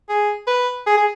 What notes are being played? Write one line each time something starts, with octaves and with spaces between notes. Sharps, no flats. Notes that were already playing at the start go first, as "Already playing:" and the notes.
G#4
B4
G#4
G#4